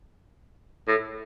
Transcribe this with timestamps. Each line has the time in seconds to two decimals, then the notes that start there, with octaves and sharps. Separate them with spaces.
0.88 A2